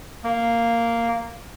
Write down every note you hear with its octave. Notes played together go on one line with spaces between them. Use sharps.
A#3